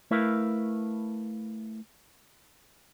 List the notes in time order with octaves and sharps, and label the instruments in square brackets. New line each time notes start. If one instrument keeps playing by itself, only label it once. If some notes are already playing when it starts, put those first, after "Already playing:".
[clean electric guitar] A3 E4 A#4 B4 E5 F5